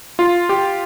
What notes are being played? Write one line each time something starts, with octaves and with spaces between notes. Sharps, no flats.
F4
G4